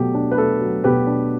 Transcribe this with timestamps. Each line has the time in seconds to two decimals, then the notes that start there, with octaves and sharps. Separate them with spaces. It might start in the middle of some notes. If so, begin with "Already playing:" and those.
Already playing: B2 F#3 A3 G4
0.15 D4
0.31 B4
0.37 A3 A4
0.61 F#3
0.84 B2 G4 B4
1.07 D4